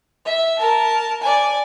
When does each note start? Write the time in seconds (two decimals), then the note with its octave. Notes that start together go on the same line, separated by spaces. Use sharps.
0.25 E5
0.58 A#4 A5
1.22 D5 G#5